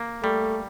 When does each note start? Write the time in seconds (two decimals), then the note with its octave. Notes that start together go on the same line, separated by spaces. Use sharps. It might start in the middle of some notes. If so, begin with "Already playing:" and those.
Already playing: A#3
0.23 G3 A3